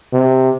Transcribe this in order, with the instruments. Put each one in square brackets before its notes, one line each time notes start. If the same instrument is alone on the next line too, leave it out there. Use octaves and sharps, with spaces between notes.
[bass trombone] C3